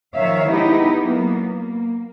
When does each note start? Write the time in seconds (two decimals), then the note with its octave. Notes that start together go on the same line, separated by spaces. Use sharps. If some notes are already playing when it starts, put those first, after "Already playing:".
0.14 D#3 F3 C#5 E5 F5
0.50 G#3 B3 D#4 E4 G4
1.04 F#3 A#3 B3
1.42 A#3